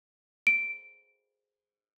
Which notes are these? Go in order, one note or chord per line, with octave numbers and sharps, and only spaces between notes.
D7